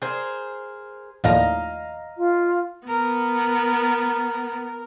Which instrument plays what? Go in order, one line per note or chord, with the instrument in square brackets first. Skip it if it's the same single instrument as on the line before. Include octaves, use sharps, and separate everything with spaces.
[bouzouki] G#4 A#4 C5
[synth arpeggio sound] D#2 A2 F3 [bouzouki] D#5 F5 A#5
[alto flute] F4
[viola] B3 [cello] A#4